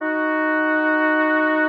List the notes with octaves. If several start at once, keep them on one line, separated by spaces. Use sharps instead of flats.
D#4 F#4